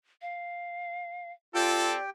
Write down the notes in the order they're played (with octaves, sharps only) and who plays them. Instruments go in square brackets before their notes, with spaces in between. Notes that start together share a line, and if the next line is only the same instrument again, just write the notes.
[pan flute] F5
[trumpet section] C4 A4 [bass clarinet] F4 [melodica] G4 G5 [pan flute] D5